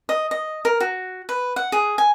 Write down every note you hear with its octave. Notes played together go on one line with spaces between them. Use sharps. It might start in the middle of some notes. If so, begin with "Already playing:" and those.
D#5
D#5
A#4
F#4
B4
F#5
G#4
G#5